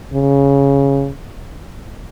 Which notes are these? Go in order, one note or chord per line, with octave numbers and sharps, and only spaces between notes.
C#3